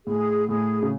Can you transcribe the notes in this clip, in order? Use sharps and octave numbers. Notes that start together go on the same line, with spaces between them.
A2 G#4
A2 G#4
C#3